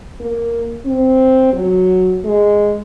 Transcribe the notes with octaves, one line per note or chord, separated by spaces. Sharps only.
A#3
C4
F#3
G#3